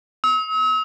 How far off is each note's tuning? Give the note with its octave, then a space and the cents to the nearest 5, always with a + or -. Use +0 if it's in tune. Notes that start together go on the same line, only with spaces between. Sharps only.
E6 -45